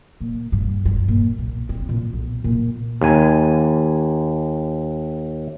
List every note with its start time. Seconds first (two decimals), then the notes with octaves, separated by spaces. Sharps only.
0.21 A#2
0.52 G2
0.85 G2
1.08 A#2
1.38 B1
1.69 C4
1.89 A#2
2.13 B1
2.44 A#2
3.01 D#2 G#5